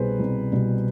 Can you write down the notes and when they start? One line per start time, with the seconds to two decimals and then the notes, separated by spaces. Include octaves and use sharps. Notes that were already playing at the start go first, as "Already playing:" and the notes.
Already playing: C2 B2 G3 G#4 B4 C5
0.19 C2
0.52 B2 G3